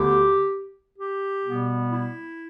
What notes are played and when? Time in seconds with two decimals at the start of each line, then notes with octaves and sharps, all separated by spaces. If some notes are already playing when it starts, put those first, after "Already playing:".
Already playing: D2 D3 B3 G4
0.99 G4
1.44 B2 G3 B3
1.90 E4